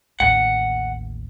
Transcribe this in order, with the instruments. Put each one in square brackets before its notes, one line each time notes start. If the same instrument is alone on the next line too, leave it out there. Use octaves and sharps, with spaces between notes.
[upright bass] A1 D#2 [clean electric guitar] F#5